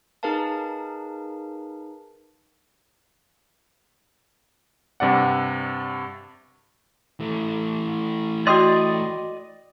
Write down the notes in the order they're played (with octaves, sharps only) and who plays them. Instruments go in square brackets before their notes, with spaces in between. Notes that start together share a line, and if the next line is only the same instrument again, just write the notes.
[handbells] D#4 G#4 A#4 B4 F5 A5
[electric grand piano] G2 C3 D5 F#5
[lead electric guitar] E3 A3
[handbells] F#4 G5 C6 [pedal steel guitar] D5 D#5 D#6